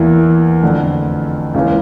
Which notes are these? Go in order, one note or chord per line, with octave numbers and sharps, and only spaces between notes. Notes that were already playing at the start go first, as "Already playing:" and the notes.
Already playing: E2 E3 A#3 E4
F2 D3 A3
C#2 C#3 E3 A#3 C#4